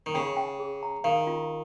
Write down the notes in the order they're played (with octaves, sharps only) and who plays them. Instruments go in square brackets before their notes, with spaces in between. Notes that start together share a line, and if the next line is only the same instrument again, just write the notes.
[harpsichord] D#3
[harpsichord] C#3 [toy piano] G5
[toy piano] G5
G#4
A#5
[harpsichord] D#3 [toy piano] F5
[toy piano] F4